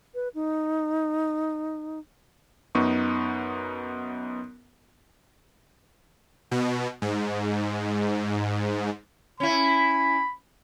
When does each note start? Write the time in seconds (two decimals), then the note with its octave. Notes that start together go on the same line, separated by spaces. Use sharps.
0.15 B4
0.35 D#4
2.75 F#2 B3 D#4 C#6
6.51 B2
7.02 G#2
9.40 C#4 E4 B5